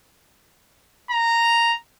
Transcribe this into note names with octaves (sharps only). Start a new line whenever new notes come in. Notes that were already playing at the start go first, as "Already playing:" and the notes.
A#5